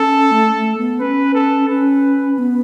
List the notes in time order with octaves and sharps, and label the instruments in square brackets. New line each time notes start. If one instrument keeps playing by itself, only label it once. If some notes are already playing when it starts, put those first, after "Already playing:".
Already playing: [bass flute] C#4 [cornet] A4
[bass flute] A3
A3
B3
[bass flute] C#4 [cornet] B4
[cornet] A4
[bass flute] C#4 [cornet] B4
[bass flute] B3